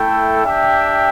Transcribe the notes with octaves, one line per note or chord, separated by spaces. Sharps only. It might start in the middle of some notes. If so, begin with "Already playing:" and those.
Already playing: A3 E4 A4 E5 G5
D4 G4 E5 G5